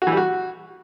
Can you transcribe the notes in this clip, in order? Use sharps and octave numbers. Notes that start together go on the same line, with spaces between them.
F#4
E3
G3
F#4